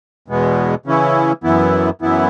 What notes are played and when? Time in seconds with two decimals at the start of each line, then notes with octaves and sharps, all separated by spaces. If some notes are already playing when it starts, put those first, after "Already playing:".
0.28 E2 B2 G#3 B3
0.86 C#3 E3 C#4 E4
1.44 F#2 E3 B3 E4
2.01 F#2 E3 B3 E4